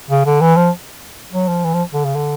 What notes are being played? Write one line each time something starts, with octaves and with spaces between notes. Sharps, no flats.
C#3
D3
E3
F3
F#3
F3
E3
F3
D3
C#3
D3